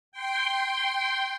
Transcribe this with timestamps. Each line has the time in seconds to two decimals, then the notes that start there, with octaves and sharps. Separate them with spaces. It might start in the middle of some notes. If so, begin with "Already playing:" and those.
0.12 G5 C6